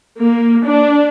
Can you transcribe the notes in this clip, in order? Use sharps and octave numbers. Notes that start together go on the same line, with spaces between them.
A#3
D4